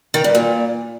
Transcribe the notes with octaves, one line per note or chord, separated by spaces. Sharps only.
D#3
G2
A#2